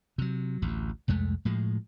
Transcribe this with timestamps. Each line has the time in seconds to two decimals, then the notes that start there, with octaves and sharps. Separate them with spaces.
0.18 C3 F#3
0.62 A1 D2
1.08 C2 F2 G#3 A3
1.45 A2 F3 G#3